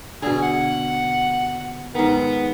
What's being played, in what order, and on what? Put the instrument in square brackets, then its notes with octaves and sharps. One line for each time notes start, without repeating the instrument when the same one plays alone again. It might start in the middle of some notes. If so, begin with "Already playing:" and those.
[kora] B2 D3 [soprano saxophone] G#4
[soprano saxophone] F#5
[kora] G#2 D#3 [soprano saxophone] B3